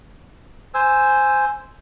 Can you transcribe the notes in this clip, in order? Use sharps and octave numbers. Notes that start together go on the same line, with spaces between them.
C5 G#5 E6